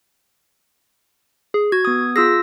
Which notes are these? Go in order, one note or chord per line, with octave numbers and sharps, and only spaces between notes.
G#4
F#4 G#6
B3 D#6
F4 G#4 E6 A#6